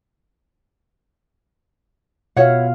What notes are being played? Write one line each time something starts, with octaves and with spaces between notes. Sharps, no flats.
B2 E4 F4 C#5 F5 F#5